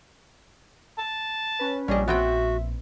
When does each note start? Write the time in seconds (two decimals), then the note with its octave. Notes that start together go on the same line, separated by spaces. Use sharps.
0.98 A5
1.59 C#4 B4
1.88 A#1 G3 C#4 D4 D#5
2.08 B3 C4 F#4 E5 G5